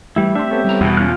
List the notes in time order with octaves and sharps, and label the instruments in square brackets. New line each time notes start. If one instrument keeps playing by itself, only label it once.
[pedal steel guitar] E3 G3 E4 [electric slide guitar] A3
[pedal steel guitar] C4 G4 E5 [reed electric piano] D4 C6
[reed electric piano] B3 A4 C#5
[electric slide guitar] G3 E4 A#5
[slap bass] E2 B2 [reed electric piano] F#4 B5 D#6
[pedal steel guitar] C#4 F#6 [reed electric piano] F4 F6